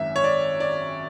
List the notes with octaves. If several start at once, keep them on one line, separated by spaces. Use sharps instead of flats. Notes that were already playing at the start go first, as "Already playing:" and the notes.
Already playing: G#1 F#2 D#3 G#3 E5
C#5
D5
D5